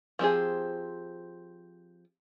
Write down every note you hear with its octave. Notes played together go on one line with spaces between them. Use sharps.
F3 C4 G4 G#4